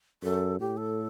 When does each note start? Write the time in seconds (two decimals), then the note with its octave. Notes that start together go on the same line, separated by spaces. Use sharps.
0.23 F#2 A4
0.60 A2 G4
0.77 A4